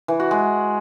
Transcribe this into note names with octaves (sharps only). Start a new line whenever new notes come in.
E3
F#4
G#3